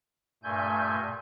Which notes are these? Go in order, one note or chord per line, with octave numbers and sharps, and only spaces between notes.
G2 A#2 A3 G#5 G6